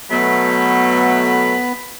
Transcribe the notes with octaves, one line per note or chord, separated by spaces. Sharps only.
B2 F#3 A3 B3 B5